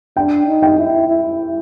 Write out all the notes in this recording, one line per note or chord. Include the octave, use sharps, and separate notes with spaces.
D4 G5
D#4
G5
E4
E4